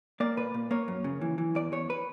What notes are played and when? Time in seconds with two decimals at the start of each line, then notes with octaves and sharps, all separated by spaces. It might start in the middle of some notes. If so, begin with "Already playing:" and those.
0.20 A#3 D5
0.37 A#2 B4
0.54 A#2
0.71 A#3 C#5
0.88 F#2
1.04 C#3
1.21 E3
1.38 E3
1.55 E2 D5
1.72 E2 C#5
1.90 B4